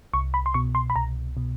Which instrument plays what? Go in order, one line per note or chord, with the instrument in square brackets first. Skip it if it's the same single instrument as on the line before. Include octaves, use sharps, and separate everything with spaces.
[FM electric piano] C2 C#6
B5
C6
B2 C#6
C6
B5
C2 A#5
B2